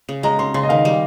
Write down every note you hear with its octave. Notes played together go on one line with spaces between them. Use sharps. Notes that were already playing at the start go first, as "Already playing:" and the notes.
C#3
G#3 A#5
C#4 C6
C#3 C6
D#5
D#3 F5
G3